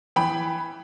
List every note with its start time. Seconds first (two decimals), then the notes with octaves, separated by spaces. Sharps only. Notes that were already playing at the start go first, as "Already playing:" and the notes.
0.16 E3 G5 B5